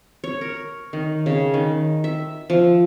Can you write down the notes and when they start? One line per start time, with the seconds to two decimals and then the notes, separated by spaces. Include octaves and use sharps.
0.24 C#5
0.41 A#4
0.93 D#3
1.26 C#3
1.54 D#3
2.04 E5
2.50 F3